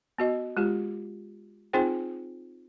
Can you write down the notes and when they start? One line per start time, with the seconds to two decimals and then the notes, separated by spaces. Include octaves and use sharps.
0.18 B3 F#4 D#5
0.57 G#3 F4 G4
1.73 C4 D#4 F4 G#4 C5 G5